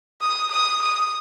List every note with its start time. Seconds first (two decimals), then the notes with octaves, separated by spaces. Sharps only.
0.21 D#6
0.51 D#6
0.82 D#6